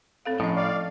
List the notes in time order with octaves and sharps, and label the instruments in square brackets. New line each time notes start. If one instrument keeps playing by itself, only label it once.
[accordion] A2 [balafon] C4 A4 F5
[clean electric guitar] A2 [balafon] F3 C#4 D#5 [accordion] G#3
[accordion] D5 F5